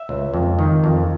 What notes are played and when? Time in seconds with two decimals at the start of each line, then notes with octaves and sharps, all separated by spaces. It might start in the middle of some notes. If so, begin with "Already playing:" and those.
Already playing: E5
0.09 C#2
0.34 F2
0.59 D#3
0.84 F2